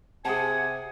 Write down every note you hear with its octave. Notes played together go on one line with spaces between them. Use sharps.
C3 G#4 F#5 G#5 A5